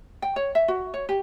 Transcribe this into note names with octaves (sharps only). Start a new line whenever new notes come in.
G5
C#5
E5
F#4
C#5
G4